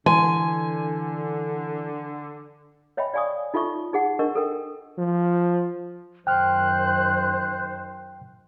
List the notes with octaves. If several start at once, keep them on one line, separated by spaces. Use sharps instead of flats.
D3 E3 G#5 C6
C#5 D#5 E5 G5 G#5 B5
D5 F5 G#5 C#6 D#6
D#4 F4 A4 E5 C#6
D#4 G#4 F#5
D4 A#4 D#5 C#6
A4 A#4 G5
F3
F#2 D#3 C5 G5 F6 F#6